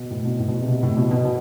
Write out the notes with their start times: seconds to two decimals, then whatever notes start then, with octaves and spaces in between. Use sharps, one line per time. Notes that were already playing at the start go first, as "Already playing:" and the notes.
Already playing: B2
0.10 A2
0.25 B2
0.39 A2
0.48 B2
0.59 C3
0.68 B2
0.83 A2
0.97 B2
1.11 B2
1.25 B2